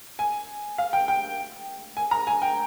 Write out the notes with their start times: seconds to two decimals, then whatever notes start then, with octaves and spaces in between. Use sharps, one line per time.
0.19 G#5
0.78 F5
0.93 G5
1.08 G5
1.97 G#5
2.11 A#5
2.27 G#5
2.42 G5